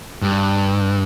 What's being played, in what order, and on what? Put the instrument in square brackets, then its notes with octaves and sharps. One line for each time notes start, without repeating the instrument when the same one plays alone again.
[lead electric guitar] G2